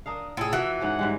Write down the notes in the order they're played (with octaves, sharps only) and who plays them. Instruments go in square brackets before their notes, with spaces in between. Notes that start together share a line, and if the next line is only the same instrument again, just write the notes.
[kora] D4 A#4 F5 [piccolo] D#6
[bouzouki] A2 G#4 [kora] F4 [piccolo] E6
[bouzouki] E3 [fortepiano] F#4
[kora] G#2 C#4 G#4 [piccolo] F#5
[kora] G#2 G3 G#3